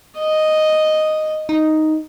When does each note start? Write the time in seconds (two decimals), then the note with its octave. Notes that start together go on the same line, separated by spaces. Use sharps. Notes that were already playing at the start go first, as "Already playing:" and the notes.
0.18 D#5
1.49 D#4